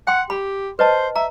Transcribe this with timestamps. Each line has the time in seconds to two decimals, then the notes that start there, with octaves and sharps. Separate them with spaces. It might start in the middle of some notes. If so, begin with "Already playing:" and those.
0.07 F#5 G5 C6
0.30 G4 B5
0.79 B4 C5 D#5 A5
1.16 E5 A#5